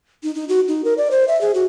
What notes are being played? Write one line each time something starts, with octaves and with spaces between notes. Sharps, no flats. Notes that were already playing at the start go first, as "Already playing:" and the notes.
D#4
D#4
F#4
D#4
A#4
D5
C5
E5
G#4
F#4